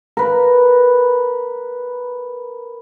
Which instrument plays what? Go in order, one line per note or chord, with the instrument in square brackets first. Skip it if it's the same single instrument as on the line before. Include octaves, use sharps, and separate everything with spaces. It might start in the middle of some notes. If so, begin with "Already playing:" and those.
[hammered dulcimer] A#4 B4